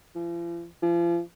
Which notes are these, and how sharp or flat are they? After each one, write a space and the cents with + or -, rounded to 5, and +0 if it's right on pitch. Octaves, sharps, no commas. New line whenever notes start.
F3 -45
F3 -40